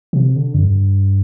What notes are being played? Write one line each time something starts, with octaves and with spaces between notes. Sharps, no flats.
C3
D3
F2
G2